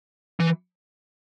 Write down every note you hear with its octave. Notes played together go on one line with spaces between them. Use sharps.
E3